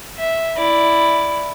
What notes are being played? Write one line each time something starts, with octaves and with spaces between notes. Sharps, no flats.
E5
E4 D5